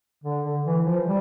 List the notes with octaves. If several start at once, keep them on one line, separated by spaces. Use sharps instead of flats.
D3
D3
E3
F3
G3